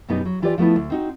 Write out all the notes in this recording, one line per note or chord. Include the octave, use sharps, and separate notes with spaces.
F#2 B2 G3 B3 D#4
F#3
E3 F4 G4 B4 D5
F3 A3 B3 E4
D2
C4 D#4 F#4